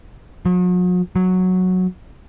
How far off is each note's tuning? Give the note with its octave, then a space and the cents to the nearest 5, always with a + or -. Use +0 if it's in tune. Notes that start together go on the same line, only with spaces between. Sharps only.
F#3 -45
F#3 -10